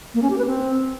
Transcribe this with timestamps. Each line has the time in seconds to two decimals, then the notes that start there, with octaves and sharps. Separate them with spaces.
0.15 A#3
0.22 C#4
0.30 G4
0.38 B4
0.46 C4